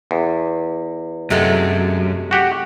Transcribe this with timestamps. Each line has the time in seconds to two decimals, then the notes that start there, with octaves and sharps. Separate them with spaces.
0.11 E2
1.30 F#2 C3 G#3 A3
2.31 F#4 G4 F#5